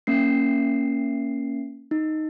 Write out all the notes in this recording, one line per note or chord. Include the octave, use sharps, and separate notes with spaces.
A#3 C#4 C7
D#4